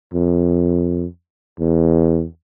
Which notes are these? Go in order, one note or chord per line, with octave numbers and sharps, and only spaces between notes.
F2
E2